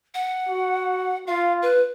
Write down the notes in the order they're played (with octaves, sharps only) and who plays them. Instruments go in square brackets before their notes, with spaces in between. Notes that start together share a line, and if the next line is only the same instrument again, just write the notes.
[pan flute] F#5
[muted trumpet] F#4
[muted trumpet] F4 [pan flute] F5
[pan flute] B4